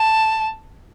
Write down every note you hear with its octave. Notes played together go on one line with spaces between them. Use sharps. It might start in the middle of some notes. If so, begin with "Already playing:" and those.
Already playing: A5